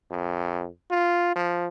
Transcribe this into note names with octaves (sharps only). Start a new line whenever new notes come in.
F2
F4
F3